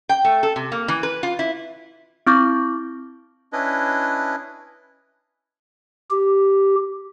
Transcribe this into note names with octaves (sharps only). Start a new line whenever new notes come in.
G5
A3
A4
C3
A#3
E3
B4
F4
E4
C4 E4 C#6 D6 G6 A#6
C#4 D4 E4 B4 D#5
G4